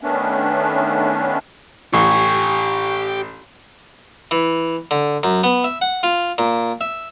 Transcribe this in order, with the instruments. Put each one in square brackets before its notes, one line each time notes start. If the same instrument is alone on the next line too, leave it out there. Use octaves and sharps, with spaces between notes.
[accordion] D#3 A3 B3 C#4 D4
[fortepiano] A1 [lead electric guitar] G4 G#5 [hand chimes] C#6
[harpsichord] E3
D3
F#2
B3
E5
F#5
F4
A#2
E5